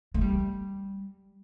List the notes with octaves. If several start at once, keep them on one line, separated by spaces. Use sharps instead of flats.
A3
G3